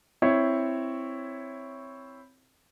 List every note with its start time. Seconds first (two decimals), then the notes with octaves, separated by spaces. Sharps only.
0.22 C4 E4 C#5